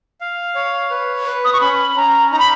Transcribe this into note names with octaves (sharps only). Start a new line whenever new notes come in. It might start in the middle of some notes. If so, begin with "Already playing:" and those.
F5
C#5
B4
B4
D#6
C#6
C#4 B5
C#4 A#5
D#4 A#5
B5